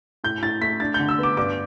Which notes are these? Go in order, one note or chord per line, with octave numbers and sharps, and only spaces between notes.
A2 G6
A2 A6
A3 B6
D4 A6
D3 G6
E6
B3 D6
G2 D6